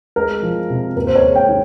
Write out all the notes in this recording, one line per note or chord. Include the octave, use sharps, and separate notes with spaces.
G#3 A#4
F3
C3
D#2 A#4
C5
C#5
G#3
G5
D#3